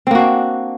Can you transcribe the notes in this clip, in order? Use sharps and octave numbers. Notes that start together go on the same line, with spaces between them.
A#3 C4 D4 F#4